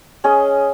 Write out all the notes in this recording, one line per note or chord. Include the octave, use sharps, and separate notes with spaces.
C#4 G#4 D#5